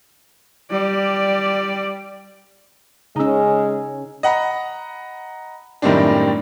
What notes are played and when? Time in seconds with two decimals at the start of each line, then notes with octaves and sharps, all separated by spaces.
0.71 G3 D5
3.16 C#3 G#3 C#4 D#4 E6
4.23 D#5 F#5 A#5 B5
5.82 F#2 A2 D#3 G3 C4 D4